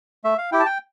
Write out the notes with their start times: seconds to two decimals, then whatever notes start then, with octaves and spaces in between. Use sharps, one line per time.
0.24 A3 E5
0.38 F5
0.52 E4 G4 G5
0.60 A5
0.66 G5